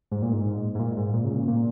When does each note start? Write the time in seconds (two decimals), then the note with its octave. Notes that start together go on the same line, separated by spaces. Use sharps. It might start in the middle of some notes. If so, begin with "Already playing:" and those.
0.11 G#2
0.22 A#2
0.33 G#2
0.75 G#2
0.79 A#2
0.97 G#2
1.13 A#2
1.25 C#3
1.36 A#2
1.47 A#2